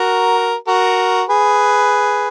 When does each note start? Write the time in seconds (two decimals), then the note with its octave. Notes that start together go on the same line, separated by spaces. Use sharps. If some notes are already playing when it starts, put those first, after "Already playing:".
Already playing: F#4 A#4
0.67 F#4 A#4
1.29 G#4 B4